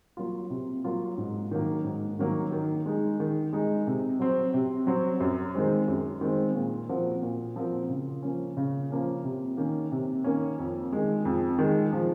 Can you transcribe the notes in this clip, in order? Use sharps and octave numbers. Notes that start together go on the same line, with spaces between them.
F#3 A#3 F4
C3
F#3 A#3 F4
G#2
D#3 F#3 A#3
G#2
D#3 F#3 A#3
D#3
G#3 D#4
D#3
G#3 D#4
C3
F#3 C4
C3
F#3 C4
F#2
D#3 G#3 C4
F#2
D#3 G#3 C4
A#2
F3 C4 F#4 A#4
A#2
F3 C4 F#4 A#4
C#3
F3 A#3 C#4
C#3
F3 A#3 C#4
C3
D#3 A#3 C#4
C3
D#3 A#3 C#4
F2
D#3 G#3
F2
D#3 G#3
F3